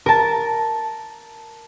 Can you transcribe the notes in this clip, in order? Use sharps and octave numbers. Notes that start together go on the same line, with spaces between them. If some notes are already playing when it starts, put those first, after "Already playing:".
A#4 A5